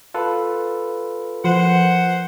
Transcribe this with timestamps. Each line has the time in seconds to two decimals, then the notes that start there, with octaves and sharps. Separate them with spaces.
0.14 F4 A4 B4
1.44 F3 A#3 C5 F#5